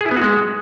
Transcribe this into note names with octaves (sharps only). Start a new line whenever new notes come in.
G#4
E4
B3
F#4
G#3